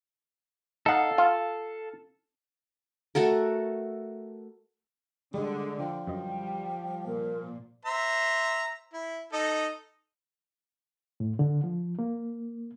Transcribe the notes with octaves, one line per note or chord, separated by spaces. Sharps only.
D#4 A4 F5 F#5
F4
A3 F#4 A4 A#4
D3 G3 G#3
F3 G5
F#2 G3 D#5
A#2 A#4
C5 E5 A#5
E4
D#4 A4 D#5
A2
D3
F3
A#3